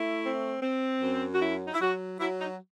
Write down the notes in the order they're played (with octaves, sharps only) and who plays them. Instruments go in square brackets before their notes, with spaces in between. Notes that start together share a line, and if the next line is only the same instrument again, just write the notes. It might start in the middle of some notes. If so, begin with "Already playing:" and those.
Already playing: [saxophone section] A3 E4
C4
C4
F#2
F#4
F#3 E4
D#4
E4
F#3 F#4
F#3 E4
D#4